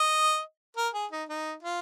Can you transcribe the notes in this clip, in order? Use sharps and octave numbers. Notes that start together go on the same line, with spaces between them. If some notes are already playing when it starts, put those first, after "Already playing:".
Already playing: D#5
A#4
G#4
D#4
D#4
F4